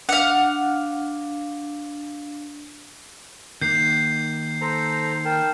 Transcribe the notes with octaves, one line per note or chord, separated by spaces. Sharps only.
D4 F5 F#5
D#3 A#3 F#5 G6 C7
A4 C5 A#5
A#4 G5 A5